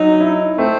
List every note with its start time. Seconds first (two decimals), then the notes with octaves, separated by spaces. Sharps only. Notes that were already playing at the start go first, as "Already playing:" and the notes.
Already playing: F#3 D#4
0.21 E4
0.58 A3 C4